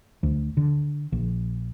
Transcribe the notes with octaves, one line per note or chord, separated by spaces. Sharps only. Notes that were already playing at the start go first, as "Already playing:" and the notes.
D2
D3
A#1